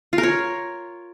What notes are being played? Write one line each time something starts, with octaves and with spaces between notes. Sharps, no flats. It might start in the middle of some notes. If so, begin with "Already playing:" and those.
F4
A#4
C#5